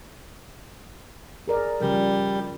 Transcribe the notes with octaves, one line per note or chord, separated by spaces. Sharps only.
G#4 A#4 D5
C#3 F3 G3 A#4